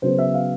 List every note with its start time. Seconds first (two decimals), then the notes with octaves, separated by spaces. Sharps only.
0.02 C#3 F#3 B3 C5
0.19 E5
0.34 F5